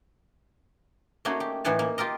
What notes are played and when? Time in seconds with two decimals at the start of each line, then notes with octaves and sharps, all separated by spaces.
1.25 A3 A#3 C#4 D#4 F#4 G#4
1.40 G4
1.64 A2 E3 D#4 F#5 G#5 A5
1.79 A#3
1.98 F4 G4 A#4 D#5